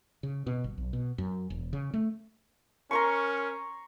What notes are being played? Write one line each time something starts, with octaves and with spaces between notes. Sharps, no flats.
C#3
B2
G1
B1
B2
F#2
E1
C#3
A3
C#4 A#4 A#5 C6 C#6